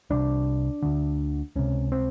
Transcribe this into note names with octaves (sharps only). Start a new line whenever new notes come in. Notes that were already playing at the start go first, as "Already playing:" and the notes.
C2 C3 D4
D2 D3
C#2 C3 C#4
C4